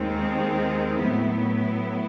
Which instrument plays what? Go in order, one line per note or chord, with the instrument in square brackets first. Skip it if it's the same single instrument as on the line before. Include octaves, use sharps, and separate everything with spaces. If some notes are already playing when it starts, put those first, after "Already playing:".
Already playing: [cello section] D#2 D#3 G#3 C4
A2 F#3 B3 E4